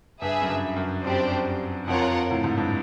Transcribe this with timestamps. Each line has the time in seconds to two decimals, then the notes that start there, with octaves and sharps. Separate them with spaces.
0.21 G2 G#4 B4 E5
0.42 F#2
0.49 G2
0.76 F#2
1.04 F2 D4 G4 C5
1.87 F2 F4 A#4 C#5 F#5
2.31 A2
2.44 G#2
2.57 G2